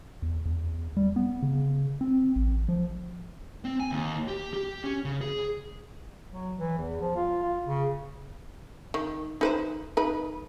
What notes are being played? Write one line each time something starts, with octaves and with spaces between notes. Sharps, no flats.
E2
E2
G3
B3
C#3
C4
A1
F3
C4
G#5
D#2
G4
G4
C#4
C#3
G#4
F#3
E3
E2
F3
F4
F4
C#3
D#3
D#4 B4 C5
D#4 B4 B5